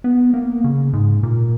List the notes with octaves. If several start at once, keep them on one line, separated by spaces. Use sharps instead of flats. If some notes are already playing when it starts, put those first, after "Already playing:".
B3
A#3
C#3
G#2
A#2